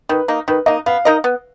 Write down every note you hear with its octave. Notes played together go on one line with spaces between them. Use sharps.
D#3 B4
A#3 D#4
D#3 B4
A#3 D#4 D#5
B3 F5
D#4 A#4 D#5
B3